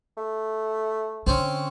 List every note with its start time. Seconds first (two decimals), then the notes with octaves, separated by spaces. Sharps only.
0.17 A3
1.27 D3 C4 C#4